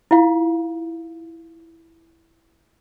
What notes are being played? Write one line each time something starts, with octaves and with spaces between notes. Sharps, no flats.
E4 F4 F5